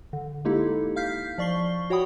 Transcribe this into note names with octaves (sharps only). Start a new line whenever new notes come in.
D3
G#3 A#3 D#4 E4 G4 A4
F5 F6 G6 B6 C7
F3 D5 C#6 C7 G7
F#4 C#5 F#5 G5 B5 D#6